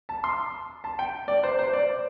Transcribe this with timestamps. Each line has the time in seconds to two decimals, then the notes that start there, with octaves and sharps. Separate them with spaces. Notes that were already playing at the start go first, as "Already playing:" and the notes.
0.09 A5
0.24 C6
0.84 A5
0.99 G5
1.28 D5
1.43 C5
1.59 C5
1.73 D5